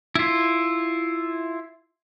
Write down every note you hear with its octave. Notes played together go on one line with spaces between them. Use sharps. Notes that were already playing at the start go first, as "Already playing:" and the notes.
E4 F4